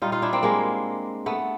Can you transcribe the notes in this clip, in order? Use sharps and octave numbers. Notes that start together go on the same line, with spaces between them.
A#2 G3 D#4 F4
D#4 F4
D4 E4
A#3 C4
G#3 A#3
A3 B3